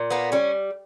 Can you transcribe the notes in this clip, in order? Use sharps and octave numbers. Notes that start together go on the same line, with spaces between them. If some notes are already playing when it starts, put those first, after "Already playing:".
Already playing: A#2
A#3 B3
G3 C#4